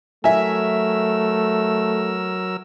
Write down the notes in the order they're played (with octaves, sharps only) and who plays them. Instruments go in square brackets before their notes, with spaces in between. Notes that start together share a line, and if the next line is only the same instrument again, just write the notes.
[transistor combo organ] F#3 A#4 E6 [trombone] A3 [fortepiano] E5 G#5